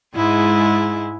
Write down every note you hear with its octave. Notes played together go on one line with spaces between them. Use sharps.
G#2 G#3 E4